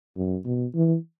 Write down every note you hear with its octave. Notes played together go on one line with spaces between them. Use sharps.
F#2
B2
E3